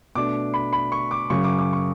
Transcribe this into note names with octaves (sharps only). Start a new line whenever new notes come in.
B2 A3 D4 D6
B5
B5
C#6
D6
F#2 C#3 F#3 C#6
D6
D6
C#6